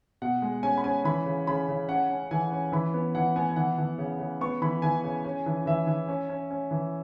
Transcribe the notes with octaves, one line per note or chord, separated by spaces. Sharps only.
B2 F#5
G#3
C#4 G#5
B5
C#4 G#5
E3 B5
C#3
C#3 B5
C#3
C#4 F#5
C#4
E3 G#5
C#4
E3 B5
B3
E3 F#5
B3 G#5
G#5
E3 F#5
E3
C#3
C#3
B3 C#6
E3 B5
E3 G#5
C#3
C#4
E3
E3 E5
E3
C#4
C#4
C#4
E3